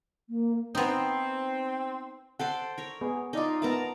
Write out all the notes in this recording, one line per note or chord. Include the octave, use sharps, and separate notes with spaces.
A#3
B3 C4 D#4
A4 C5 D5 F#5
A#4 C#5
B3 G#4
D#4 F4 A4 D5 D#5
B3 A#4 D5 E5 A5 A#5